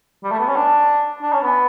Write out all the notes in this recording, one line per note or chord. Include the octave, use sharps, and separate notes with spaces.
G3
A3
B3
C#4
D4
D4
C#4
B3